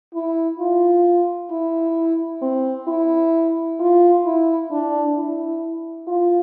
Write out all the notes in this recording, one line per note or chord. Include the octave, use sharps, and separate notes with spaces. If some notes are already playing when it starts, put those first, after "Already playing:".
E4
F4
E4
C4
E4
F4
E4
D4
E4
F4